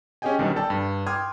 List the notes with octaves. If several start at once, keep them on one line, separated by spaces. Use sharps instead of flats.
C#4 G4 G#4 D#5 G5 G#5
B1 B2 D3 D#3 G3
A4 D5 G5 A5
G2
G5 C6 D6 D#6 F6 G#6